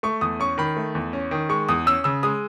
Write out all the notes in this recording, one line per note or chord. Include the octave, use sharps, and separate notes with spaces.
A3 C#6
E2 D#6
C#4 C#6
D#3 B5
A3
E2
C#4
D#3
G#3 C#6
E2 D#6
C#4 E6
C#3 E6
G#3 D#6